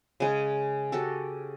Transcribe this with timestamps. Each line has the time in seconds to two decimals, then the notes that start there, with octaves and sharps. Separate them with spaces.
0.20 C#3 G#3
0.92 F#4 G4 A4